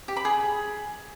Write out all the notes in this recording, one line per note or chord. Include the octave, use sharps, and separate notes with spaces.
G4
B5
G#4